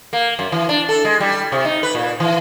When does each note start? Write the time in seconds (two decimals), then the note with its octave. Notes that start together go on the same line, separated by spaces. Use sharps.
0.13 A#3
0.39 F#2
0.52 E3
0.69 D4
0.89 A4
1.05 G#3
1.20 G3
1.52 C3
1.65 D#4
1.83 B4
1.95 A#2
2.20 E3